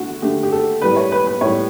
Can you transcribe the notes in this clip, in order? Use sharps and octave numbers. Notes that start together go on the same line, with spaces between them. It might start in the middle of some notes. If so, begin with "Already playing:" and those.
Already playing: D3 A3 F#4
D3 A3 G4
G4
A4
A2 G3 B4
C#5
B4
B4
A2 G3 C#5